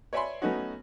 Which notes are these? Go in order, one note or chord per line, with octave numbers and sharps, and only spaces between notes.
C#5 D5 E5 G#5 B5 C6
F#3 A3 B3 C#4 D#4 F#4